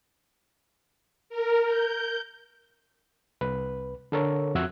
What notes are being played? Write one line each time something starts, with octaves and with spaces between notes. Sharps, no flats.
A#4
G6
C2 B4
D3 A4 A#4 C#5
F2 F#4 E5 E6 F#6 G#6